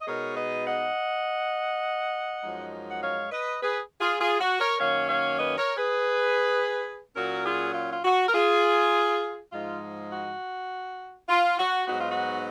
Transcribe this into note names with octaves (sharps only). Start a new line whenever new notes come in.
D#5
B2 G#3 B3 D#4 A#4 C#5
B4 D#5
D#5 F#5
F#2 F3 G#3 D#4
F#5
C#5 F5
B4 D#5
G#4 B4
F4 G#4
F4 G#4
F#4
A#4 C#5
F#2 D#3 A#3 C#4 C#5 F5
C#5 F5
B4 D#5
A#4 C#5
G#4 B4
A#2 F#3 C#4 F#4 A#4
F4 G#4
F4
F4
F#4
A#4
F4 G#4
G#2 F3 G#3 D#4 F4
F#4
F4
F#4
G#2 F#3 B3 D#4 F#4
F4
F#4